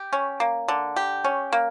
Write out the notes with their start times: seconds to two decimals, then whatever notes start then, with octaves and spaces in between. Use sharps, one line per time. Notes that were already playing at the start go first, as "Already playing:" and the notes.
Already playing: G4
0.13 C#4
0.40 A#3
0.68 D3
0.96 G4
1.24 C#4
1.53 A#3